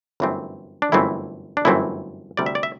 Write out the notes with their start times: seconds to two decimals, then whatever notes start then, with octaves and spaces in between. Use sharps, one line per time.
0.20 G1 F#2 E3 A3 C4
0.82 D4
0.92 G1 F#2 E3 A3 C4 E4
1.57 D4
1.65 G1 F#2 E3 A3 C4 E4
2.37 D2 C3 G3 D5
2.46 E5
2.55 D5
2.63 E5